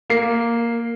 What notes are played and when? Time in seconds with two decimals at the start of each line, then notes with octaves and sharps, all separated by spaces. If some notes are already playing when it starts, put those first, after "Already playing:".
0.10 A#3 C7